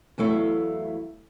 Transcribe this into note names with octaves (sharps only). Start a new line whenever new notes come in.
E2 F#3 A3 E4 F5